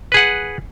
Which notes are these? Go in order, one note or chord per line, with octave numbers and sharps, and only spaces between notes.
G#4 B4 F#5